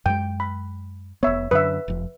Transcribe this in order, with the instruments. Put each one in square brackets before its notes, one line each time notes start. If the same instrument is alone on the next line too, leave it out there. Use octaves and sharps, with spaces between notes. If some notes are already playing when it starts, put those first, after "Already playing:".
[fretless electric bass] F#2 G#3 [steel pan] G5
[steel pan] B5
[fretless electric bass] F1 B3 [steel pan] C#5 E5
[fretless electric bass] F#2 D3 [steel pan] B4 E5
[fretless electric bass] F1 F2